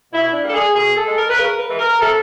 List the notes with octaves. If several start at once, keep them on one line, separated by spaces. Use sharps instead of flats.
B2 E4
D4
G3 A#3
A4
G#4
B2 G#4
A4
G#3
A#4
B4
C#3 A#4
B4
E3 G#3
A#4
C3 A4